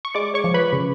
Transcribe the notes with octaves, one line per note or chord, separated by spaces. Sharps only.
C#6
G#3 D5 D6
C#5 C#6
F3
B4 B5
C#3